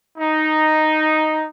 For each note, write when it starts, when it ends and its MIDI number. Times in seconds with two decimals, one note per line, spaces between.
0.18 1.46 63